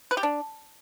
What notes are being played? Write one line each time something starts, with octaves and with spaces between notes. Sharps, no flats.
B4
G4
D4